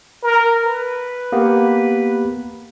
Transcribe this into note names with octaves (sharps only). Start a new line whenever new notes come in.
A#4
B4
A#3 B3 G4